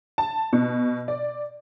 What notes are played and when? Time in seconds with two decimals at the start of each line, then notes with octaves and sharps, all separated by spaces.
0.18 A5
0.53 B2
1.08 D5